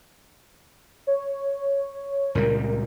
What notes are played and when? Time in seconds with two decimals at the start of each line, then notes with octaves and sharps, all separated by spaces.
1.07 C#5
2.35 C#2 A#2 G3 A#4